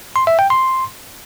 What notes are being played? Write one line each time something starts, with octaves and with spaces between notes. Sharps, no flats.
C6
E5
G5
C6